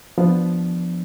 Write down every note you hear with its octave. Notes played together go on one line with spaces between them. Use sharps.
F3 B3 D4